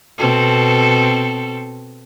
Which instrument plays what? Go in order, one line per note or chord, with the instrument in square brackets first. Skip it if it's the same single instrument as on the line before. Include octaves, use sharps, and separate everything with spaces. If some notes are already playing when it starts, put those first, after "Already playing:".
[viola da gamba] B2 C4 A4